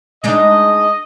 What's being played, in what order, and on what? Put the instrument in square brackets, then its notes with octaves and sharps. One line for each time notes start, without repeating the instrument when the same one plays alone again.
[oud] G#3 D4 D#4 [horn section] D#5